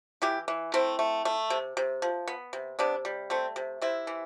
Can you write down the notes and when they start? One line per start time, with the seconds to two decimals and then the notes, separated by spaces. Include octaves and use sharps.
0.22 E3 E4 G4
0.48 E3
0.74 A3 C4 E4
0.99 A3
1.25 A3
1.50 C3
1.77 C3
2.02 F3
2.28 B3
2.53 C3
2.79 C3 B3 D4
3.05 G3
3.30 A3 C4
3.56 C3
3.82 C3 C4 E4
4.07 E3